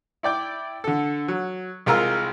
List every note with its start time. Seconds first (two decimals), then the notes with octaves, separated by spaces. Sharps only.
0.23 E4 D5 G5 D6
0.84 D3 A4
1.28 F#3
1.86 C2 G#3 F4 A#4 A#5 E6